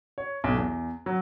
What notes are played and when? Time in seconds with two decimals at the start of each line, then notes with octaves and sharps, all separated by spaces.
0.18 C#5
0.44 B1
0.56 E2
1.06 F#3